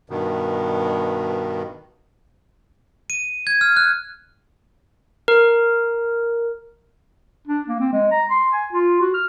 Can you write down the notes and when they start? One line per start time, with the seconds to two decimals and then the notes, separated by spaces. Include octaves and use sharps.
0.10 G2 B2 D#3
3.10 D#7
3.47 G#6
3.61 F6
3.77 F#6
5.28 A#4
7.47 D4
7.68 A#3
7.80 C4
7.93 G#3
8.12 A#5
8.30 C6
8.52 G#5
8.72 F4
9.00 F#4
9.14 F6